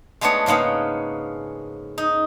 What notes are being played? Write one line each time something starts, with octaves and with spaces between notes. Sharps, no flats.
G#3 A3 B3 D4 C#5
G#2 C#3 A#3 B3 C#4
D#4